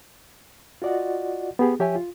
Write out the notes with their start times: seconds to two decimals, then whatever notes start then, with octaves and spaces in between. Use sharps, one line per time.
0.82 F4 F#4 D5 D#5 F#5
1.59 B3 G4 G#4
1.80 F3 G4 C#5 E5 G5 G#5
1.96 F4